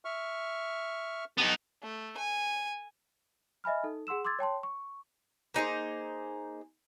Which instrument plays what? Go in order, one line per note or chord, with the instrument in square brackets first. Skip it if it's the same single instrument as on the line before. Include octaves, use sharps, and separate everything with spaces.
[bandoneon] E5 C#6 F6
[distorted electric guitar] B3 D#4 [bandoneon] G4 A5
[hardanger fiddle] A3
G#5
[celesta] D#5 E5 G#5 B5 F6
D#4 A4
G#4 F#5 C6 E6 E7
C6 D6 E6 G#6 A6
C#5 G5 A5 C6
C#6
[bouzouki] A#3 D#4 G#4 C5